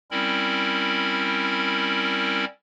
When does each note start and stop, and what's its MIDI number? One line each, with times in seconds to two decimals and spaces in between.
0.11 2.45 55
0.11 2.45 60
0.11 2.45 61
0.11 2.45 64
0.11 2.45 70
0.11 2.45 83